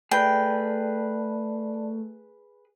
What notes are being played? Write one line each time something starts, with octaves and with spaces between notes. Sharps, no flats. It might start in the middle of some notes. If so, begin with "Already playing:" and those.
A3 G#4 B4 D5 G5 A5